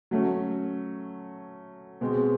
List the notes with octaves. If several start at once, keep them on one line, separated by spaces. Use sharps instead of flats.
F#3 A3 C#4
B2 G#3 C4